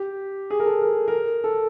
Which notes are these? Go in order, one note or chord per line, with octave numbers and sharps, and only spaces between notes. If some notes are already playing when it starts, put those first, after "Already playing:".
Already playing: G4
G#4
A#4
A4
A#4
A#4
A4